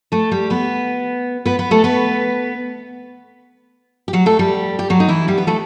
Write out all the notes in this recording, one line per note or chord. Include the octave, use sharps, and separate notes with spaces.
A3 A4
G3 G4
B3 B4
B3 B4
B3 B4
A3 A4
B3 B4
G4
F#3 F#4
A3 A4
G3 G4
G4
F#3 F#4
D#4
E3 E4
G3 G4
B3 B4
A3 A4